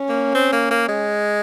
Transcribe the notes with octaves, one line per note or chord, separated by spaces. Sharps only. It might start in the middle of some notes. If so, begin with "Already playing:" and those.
Already playing: C#4
A#3
C4
A#3
A#3
G#3